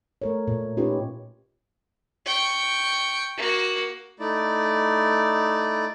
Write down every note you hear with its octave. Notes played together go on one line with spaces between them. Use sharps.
A3 A#4 C#5
A#2
C#4 D#4 F4 G4 B4 C#5
G5 C#6
A#3 F#4
A3 D#4 E4 D5